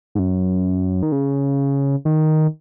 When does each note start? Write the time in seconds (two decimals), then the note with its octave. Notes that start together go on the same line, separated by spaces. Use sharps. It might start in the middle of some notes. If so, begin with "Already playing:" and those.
0.15 G#2
0.19 F#2
1.03 D#3
1.12 C#3
2.05 D#3